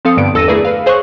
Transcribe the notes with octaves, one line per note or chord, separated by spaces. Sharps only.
F3 C4 A4 F5 D#6 C#7
G2 D3 B3 D7
G1 E2 A4 E6 A#6 D#7
A3 E4 G#4 A#4 B4 D5
B4 F5
G#4 C5 C#5 D#5 C#6 F#6